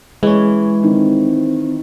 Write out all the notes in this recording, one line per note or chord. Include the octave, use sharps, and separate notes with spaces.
E3 G#3 C#4
D#3 C4